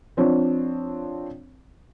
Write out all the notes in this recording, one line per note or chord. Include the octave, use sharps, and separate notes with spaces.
F3 C4 D4 C#5